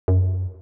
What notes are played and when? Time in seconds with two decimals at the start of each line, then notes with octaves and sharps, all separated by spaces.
0.08 F#2